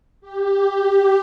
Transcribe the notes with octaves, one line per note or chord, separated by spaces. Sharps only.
G4
G4